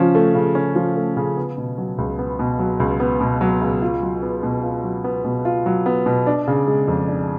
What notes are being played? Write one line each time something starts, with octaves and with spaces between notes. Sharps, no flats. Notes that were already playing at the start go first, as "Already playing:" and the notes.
Already playing: C#3 F3 C#4
A3
C#3
C#4
F3
A3
C#3
B3
B2
F#3
C#2
B3
B2
F#3
C#2
B3
B2
F#3
C#2
F4
F#3
B3
B2
F4
F#3
B3
B2
F4
F#3
B3
B2
D4
C#3
G#3
F2
D4